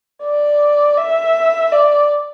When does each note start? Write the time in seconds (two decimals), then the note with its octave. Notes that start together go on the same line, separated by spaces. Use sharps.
0.23 D5
0.97 E5
1.72 D5